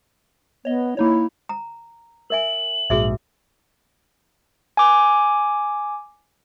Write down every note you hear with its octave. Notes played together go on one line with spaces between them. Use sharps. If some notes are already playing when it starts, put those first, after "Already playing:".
B3 C#5 D#5
A#3 D#4 E4 C#5
A#5
A#4 E5 G#5 F#7
A#1 G#2 F#4 G#4 E5
G#5 D6